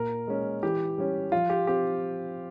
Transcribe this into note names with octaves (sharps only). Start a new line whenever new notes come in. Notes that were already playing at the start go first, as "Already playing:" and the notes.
Already playing: A#2 A#4
G#3 C#4
E3 G4
G3 C#4
F3 F4
G4
C4 G4